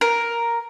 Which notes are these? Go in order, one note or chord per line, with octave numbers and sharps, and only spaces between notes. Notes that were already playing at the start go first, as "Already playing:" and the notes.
A#4